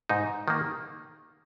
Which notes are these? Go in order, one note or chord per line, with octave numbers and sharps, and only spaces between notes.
G#2 D#4
D#3 A#3